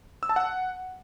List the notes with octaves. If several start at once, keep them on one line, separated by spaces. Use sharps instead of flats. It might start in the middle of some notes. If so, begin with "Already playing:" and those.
E6
A5
F#5